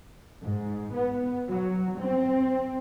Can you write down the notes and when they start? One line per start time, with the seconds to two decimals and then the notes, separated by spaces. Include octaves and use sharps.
0.43 G#2
0.94 B3
1.50 F#3
1.99 C4